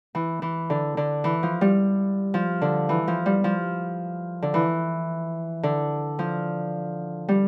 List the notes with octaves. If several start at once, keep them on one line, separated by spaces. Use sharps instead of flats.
E3
E3
D3
D3
E3
F3
G3
F3
D3
E3
F3
G3
F3
D3
E3
D3
F3
G3